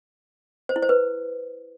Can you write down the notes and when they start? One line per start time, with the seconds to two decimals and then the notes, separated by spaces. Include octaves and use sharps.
0.69 C5
0.76 E4
0.83 C5
0.89 B4